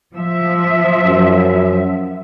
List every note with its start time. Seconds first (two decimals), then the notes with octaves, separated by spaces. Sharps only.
0.15 F3 E5
1.04 F#2